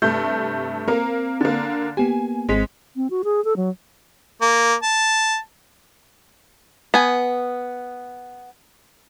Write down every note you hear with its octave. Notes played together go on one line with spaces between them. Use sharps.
G2 C3 A3 G6
A#3 C4 A#4
D3 A#3
A#3 B3 G4 G#5
G#1 G#3 C4 B6
C4
F#4
G#4
A4
F#3
A#3
A5
B3 G#5